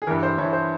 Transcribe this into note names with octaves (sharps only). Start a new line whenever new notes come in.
G#4
G2 E3 A#4
C5
G2 E3 C#5
C5